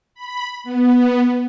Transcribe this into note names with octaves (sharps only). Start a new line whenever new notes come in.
B5
B3